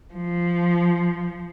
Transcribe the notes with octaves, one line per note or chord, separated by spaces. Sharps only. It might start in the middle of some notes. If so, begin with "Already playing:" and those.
F3